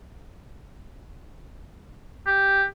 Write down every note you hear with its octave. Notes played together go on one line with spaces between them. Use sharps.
G4